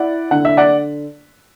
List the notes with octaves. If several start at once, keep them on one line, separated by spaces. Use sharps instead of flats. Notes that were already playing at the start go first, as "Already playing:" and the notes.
Already playing: E4 D5 F#5
D3 F#5
E5
D5 F#5